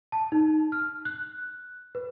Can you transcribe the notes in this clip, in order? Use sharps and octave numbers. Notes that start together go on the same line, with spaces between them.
A5
D#4
F6
F#6
B4